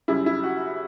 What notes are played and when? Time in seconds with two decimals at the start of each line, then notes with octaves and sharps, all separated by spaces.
0.08 F#2 C#3 G3 E4
0.26 E4
0.43 F#4